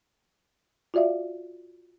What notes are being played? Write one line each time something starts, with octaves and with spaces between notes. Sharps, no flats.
F4 F#4 D5 E5 F5